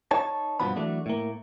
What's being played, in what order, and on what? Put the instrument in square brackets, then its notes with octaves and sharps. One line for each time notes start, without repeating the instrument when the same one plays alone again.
[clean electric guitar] D#4 C#5 A5
G2 B2 F3 B3 B5
E3 F#3 A3 D4
A2 A#3